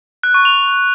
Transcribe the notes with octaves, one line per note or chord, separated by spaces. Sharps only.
F#6
C#6
F7